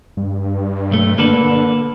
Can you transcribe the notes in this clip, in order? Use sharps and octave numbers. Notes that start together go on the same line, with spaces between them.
G2
B1 A3
D3 A#3 A4 B4